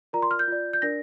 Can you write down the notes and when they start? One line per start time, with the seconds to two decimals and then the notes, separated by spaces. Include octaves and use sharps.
0.13 F4 A#4 D5 A#5
0.22 C6
0.31 F6
0.39 G6
0.48 F4 D5
0.73 G6
0.82 D4 A#4 D5 A#6